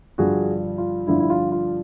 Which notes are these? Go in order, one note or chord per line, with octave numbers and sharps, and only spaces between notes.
G2 D3 F3 F#4 G#4
F4
G2 D3 F3 E4
E4
F4
F4